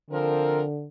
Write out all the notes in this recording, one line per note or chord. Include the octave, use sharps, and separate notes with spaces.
D3 F3 C4 A#4